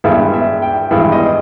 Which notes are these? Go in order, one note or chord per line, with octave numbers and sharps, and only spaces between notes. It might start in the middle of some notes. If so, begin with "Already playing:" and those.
G2 E3 G#3 B3 E5
E5
G5
G2 E3 G#3 B3 E5
D#5